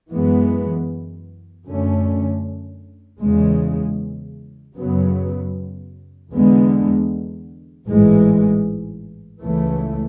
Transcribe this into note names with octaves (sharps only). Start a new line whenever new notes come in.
F#2 E3 G#3 B3
F#2 D3 A3 C#4
E2 C#3 G#3
F#2 C#3 F#3 B3
E2 D3 G#3 B3
A1 G#2 E3 G#3
C#2 C#3 E3 A3